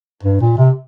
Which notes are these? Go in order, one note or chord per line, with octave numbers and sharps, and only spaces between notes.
G2
A#2
C3